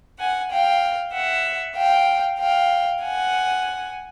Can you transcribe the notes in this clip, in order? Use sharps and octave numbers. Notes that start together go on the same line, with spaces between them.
F#5 G#5
F5 G5
E5 F#5
F5 G5
F5 G5
F#5 G#5